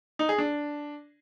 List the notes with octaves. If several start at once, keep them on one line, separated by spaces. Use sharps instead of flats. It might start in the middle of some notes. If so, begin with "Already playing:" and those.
D#4
G#4
D4